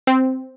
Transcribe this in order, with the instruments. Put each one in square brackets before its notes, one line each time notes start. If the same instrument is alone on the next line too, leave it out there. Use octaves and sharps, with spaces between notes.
[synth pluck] C4